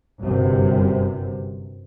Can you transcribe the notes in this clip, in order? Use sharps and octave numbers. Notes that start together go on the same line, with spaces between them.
G1 F#2 C3